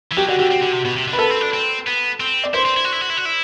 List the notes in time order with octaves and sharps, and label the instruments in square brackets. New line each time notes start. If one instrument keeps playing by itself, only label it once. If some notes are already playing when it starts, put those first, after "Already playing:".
[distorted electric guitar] E3
[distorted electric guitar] F#3 [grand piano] G4
[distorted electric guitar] D3 [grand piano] F#4
[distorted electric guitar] D3 [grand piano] G4
[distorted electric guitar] C4
D3
C3
B2
C3
D3
[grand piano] B4
[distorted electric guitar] B3 [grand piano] A4
[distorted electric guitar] C4
D4
C4
B3
C4
[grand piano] D5
[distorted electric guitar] E4 [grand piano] C5
[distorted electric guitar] C4
E4
F#4
E4
F#4
E4
F#4
E4